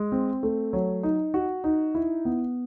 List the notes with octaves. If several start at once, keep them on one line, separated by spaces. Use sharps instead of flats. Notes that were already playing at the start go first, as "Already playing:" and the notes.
Already playing: G#3
C4
A3
F#3
D#4
F#4
D#4
E4
B3